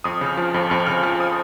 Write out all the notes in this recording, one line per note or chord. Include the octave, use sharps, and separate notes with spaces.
F2 D#6
C#3
F6
F3
F2
F2 F6
C#3 F6
F3 F6
D#6